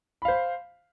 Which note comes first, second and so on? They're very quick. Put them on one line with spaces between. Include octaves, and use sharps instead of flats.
B5 F5 C5